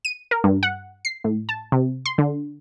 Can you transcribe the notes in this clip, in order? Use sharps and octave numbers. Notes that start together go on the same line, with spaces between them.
D#7
A#4
G2
F#5
C7
A2
A5
C3
C6
D3